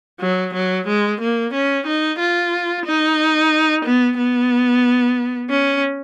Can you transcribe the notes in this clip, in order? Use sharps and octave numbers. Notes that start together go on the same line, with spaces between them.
F#3
F#3
G#3
A#3
C#4
D#4
F4
D#4
B3
B3
C#4